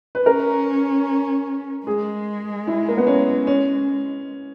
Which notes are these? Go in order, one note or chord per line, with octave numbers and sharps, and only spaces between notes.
B4
C#4 A#4
G#3 G#4
E4
A#3
B3
C#4
C#4